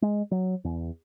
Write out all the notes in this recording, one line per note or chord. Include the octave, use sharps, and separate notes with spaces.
G#3
F#3
E2